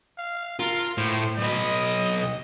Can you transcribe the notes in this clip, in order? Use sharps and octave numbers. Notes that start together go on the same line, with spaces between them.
F5
F4 A#4
A2 C5
B1 B4 D#5